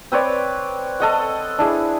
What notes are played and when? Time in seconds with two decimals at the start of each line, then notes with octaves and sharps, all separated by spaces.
0.12 C4 B4 C#5 D5
1.00 A4 D#5 F#5
1.59 D4 E4 G#4